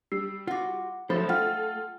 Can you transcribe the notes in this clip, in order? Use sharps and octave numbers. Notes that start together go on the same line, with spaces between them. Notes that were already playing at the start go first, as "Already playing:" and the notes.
G3 E6 C7
F4 F#4 F#5 D6
F3 F#3 A3 A4 C5 B5
A3 F4 F#5 G5 F6